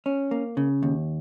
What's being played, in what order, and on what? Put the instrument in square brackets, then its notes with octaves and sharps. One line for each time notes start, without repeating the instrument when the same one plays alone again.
[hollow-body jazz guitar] C#4
A#3
C#3
D#2